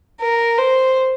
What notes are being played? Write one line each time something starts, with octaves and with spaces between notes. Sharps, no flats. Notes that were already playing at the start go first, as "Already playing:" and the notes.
A#4
C5